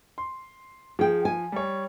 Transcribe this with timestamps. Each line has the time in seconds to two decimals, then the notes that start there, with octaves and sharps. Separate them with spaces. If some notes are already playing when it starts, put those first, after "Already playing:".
0.18 C6
0.99 F3 G#4 G5
1.25 G#5
1.52 G3 C#5